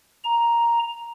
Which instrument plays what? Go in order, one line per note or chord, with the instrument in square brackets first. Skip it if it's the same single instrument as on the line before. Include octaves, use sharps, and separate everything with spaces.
[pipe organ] A#5